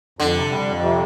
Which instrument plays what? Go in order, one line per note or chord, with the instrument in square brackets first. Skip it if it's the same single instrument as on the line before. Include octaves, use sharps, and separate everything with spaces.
[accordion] F2 [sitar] D3
[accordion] C3
G3
F2
C3